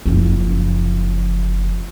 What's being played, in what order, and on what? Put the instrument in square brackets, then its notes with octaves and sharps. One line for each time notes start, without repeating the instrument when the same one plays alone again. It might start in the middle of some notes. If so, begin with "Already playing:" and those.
[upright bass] F#1 F3